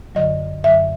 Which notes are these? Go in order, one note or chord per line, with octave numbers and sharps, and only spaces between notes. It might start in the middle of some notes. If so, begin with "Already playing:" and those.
F#2 D3 F#3 D#5
F#2 D3 F#3 E5